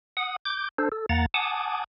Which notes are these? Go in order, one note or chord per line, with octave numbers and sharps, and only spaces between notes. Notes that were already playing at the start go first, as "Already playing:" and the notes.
F#5 D#6
D6 G6
D4 A4 C5
A4
E2 A#3 F#5 A#5 A6
F#5 G#5 A5 D6 D#6